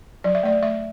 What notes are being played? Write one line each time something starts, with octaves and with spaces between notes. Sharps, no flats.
F#3 D5
E5
A3 D5
A3 E5